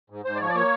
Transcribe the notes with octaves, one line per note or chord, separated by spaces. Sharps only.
G#2
G#2 C5
D5
F3 C#5
D5
A#3 C#5